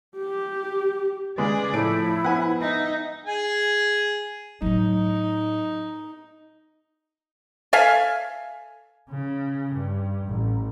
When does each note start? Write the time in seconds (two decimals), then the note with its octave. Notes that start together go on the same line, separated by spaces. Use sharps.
0.18 G4
1.38 C#3 G#3 G#4 B4 D5
1.74 A2 F3 A3 E4 D7
2.24 B3 C5 F#5 G#5
2.61 D#4 E5
3.26 G#4 G#5
4.62 A2 F#3 D#4
7.73 A4 E5 F5 G#5
9.10 C#3
9.74 G2
10.26 A1